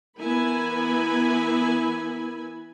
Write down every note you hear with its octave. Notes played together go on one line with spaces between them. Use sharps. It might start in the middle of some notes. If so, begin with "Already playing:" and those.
E3 B3 E4 A#4 G#5 B5